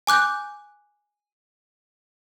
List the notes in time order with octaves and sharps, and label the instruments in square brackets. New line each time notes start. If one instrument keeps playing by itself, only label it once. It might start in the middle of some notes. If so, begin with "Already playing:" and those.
[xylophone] G#5 D6 F#6 G6